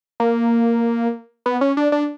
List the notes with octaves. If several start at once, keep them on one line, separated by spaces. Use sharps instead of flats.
A#3
B3
C#4
D4
D4